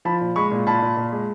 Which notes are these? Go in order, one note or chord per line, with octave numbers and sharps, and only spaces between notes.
F3 A5 B5
A#2
G#3 B5 C#6
A#2
A#2 A5 B5
A#2
A#2
G#3